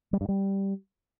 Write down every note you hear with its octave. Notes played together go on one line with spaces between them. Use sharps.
G3
G2
G3